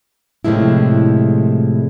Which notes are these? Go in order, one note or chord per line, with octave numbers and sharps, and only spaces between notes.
A2 C3 F3 G#3 E4